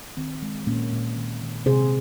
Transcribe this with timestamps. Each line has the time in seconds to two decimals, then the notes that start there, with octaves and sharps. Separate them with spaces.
0.17 D#3 C4
0.42 G#3
0.67 A#2 A#3 C#4
0.92 A#2
1.16 D#3
1.42 D#3
1.66 C3 G#4 C5